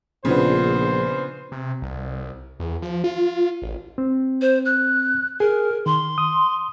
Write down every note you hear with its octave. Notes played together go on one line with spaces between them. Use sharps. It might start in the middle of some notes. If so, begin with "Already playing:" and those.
A#1 C#3 A#3 B3 D4 F4 C5
C3
C2
E2
F3
F4
A1
C4
C5
F#6
G#4 A#4
D#3 C6
D#6